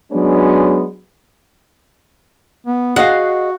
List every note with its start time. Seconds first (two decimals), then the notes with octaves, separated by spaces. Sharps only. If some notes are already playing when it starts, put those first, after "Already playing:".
0.12 F#3 G#3 B3 C#4 D4
2.66 B3
2.96 F#4 G#4 D#5 F5 F#5